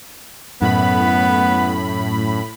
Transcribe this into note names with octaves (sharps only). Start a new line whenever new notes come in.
F#2 A2 B3 B5